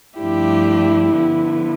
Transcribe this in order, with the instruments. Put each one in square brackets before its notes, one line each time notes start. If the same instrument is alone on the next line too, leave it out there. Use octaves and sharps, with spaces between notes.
[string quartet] G2 F3 A3 D4 G4 [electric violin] E4
[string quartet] D3 F3 B3